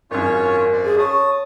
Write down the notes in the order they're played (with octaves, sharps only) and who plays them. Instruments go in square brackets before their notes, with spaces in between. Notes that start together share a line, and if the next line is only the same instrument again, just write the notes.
[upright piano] G#1 F#2 [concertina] C#4 F4 C#5 [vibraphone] A#4
[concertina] C5 D5
[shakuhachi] G#4
[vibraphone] C#5 [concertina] A5 D#6 [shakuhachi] C#6